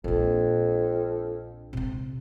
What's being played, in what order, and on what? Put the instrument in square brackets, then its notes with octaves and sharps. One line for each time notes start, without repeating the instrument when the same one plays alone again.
[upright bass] A#1 D4 [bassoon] F2
[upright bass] C3 C4